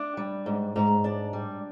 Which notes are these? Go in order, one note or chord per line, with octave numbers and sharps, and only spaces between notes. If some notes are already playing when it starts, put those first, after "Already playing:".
Already playing: D4 D5
G3
G#2
G#2 A#5
D4 D5
G3